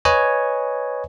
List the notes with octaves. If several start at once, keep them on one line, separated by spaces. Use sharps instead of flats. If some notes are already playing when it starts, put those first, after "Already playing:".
B4 C#5 D#5 G#5